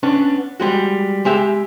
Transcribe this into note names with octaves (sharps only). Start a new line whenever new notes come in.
B3 C#4 D4
G3 G#3 F#4
G#3 G4 E5